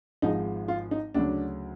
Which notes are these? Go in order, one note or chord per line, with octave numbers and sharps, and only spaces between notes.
G#1 G#2 F3 G#3 D#4
F4
D#4
D2 C#3 F#3 D4